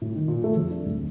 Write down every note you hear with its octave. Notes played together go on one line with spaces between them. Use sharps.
A2
D#3
A#2
A3
F2
D4
D1